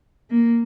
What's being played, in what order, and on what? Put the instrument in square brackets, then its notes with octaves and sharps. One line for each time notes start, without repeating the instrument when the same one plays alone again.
[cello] A#3